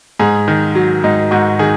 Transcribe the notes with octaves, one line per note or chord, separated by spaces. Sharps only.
G#2 G#4
D#3
F#3
G#2 D#4
G#2 F#4
D#3 G#4